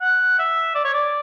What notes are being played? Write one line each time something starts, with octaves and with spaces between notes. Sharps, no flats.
F#5
E5
D5
C#5
D5